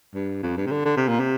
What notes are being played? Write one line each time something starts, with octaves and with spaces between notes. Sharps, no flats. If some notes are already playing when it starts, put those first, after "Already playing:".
G2
F2
G2
C3
D3
D3
C3
A#2
C3